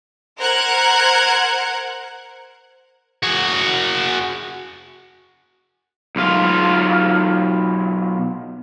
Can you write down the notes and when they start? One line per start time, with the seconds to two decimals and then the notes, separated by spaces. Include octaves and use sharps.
0.38 A#4 C5 F#5 A#5 F#6 G#6
3.23 F#4 G#4
6.16 B1 F4